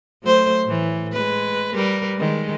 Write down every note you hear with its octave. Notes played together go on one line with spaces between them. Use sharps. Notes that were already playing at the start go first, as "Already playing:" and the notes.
F#3 A3 C5
A2 E3
G#3 B4
G3 A#4 B4
D#3 G#3